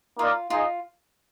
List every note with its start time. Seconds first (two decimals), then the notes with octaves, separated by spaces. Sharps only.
0.19 A#3 D#4 F4 A#4 D5
0.50 D#4 F4 G#4 D#5